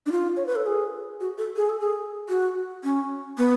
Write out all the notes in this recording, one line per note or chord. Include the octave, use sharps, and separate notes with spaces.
D4
F4
C#5
B4
A4
G#4
F#4
A4
G#4
A4
G#4
F#4
C#4
B3